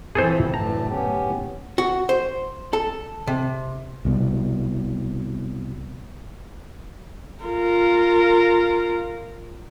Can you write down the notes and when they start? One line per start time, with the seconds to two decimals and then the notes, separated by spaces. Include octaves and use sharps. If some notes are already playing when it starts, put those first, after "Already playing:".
0.15 E3 F3 C4 G#4 A4 C5
0.54 F#1 D2 A2 E3 A5 A#5
0.88 B3 C#4 G4
1.78 F#4
2.09 C5
2.73 A4
3.27 C3
4.05 C2 B2
7.44 F4 A#4